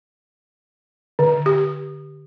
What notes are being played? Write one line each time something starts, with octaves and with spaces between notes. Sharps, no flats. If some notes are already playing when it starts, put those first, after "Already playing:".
D3
G4